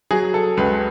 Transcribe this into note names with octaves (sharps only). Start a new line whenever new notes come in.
F#3 G#4
A4
C#2 B4